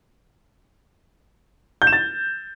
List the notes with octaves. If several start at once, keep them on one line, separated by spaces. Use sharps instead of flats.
G6
E7
A6